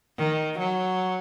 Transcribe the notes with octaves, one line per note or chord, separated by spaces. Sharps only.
D#3
F#3